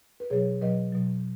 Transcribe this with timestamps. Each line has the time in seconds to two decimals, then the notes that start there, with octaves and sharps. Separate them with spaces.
0.20 B4
0.30 B2 F#3 G#4 C#5
0.62 B2 F#3 B4 D#5
0.92 B2 F#3